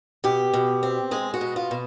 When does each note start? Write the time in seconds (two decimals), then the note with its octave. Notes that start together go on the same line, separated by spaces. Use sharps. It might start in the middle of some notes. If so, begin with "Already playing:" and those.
0.24 B2 G4
0.54 B2
0.83 C4
1.11 G#3 G#4
1.34 F#4
1.41 B2
1.56 F4
1.71 B2